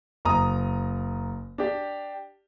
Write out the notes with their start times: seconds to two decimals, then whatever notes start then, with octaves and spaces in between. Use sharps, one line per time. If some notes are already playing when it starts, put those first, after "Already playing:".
0.25 F#1 A#5 D#6
1.58 D4 G4